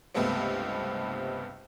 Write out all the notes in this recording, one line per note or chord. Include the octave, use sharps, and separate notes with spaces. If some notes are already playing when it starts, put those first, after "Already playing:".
C#2 G2 C3 A3 B3 C4